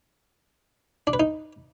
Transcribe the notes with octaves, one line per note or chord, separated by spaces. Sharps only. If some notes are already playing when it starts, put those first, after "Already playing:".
D4
B4
D#4